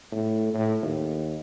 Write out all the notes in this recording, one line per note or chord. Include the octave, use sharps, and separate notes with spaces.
A2
A2
D#2